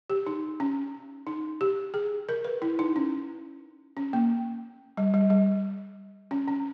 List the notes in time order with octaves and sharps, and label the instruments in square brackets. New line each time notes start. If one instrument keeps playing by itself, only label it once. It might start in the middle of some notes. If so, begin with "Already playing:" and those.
[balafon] G4
D#4
C#4
D#4
G4
G#4
A#4
B4
E4
D#4
C#4
C#4
A#3
G3
G3
G3
C#4
C#4